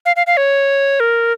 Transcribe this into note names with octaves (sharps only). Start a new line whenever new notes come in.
F5
F5
F5
C#5
A#4